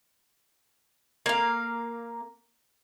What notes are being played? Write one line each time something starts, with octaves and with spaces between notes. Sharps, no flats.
A#3 F5